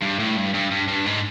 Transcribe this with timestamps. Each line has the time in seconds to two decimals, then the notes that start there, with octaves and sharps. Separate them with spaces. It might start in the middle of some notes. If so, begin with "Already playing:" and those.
0.02 G2
0.19 A2
0.36 G2
0.54 G2
0.71 G2
0.88 G2
1.06 G#2